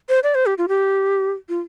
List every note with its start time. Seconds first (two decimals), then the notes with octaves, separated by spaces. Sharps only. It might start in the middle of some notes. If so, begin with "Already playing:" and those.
0.09 C5
0.23 D5
0.35 C5
0.46 G4
0.58 F4
0.68 G4
1.49 F4